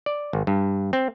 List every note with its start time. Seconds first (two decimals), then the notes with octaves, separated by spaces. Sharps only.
0.06 D5
0.33 G#1
0.47 G2
0.93 C4